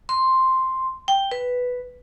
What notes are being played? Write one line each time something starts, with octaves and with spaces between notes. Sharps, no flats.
C6
G5
B4